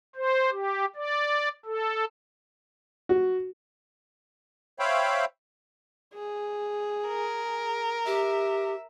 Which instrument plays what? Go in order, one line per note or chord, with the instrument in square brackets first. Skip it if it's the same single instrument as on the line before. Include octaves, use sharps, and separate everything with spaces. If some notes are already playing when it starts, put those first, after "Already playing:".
[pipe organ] C5
G4
D5
A4
[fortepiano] F#4
[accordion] C5 C#5 E5 F5 G5 B5
[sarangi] G#4
[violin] A#4
[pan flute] G4 [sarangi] E5